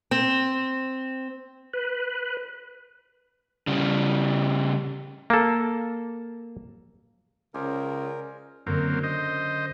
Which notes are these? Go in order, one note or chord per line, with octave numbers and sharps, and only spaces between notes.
C4
B4
C#3 G3
A#3 A4
C#2 C#3 G#4 A#4 C5 D5
F#2 D3 F#3 A#3 C4
C5 D#5